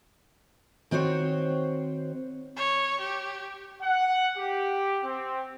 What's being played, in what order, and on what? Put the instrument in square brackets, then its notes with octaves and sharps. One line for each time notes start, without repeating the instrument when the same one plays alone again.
[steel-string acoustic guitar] D#3 C4 F#4 C5 C#5
[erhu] C#5
G4
[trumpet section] F#5
G4
C4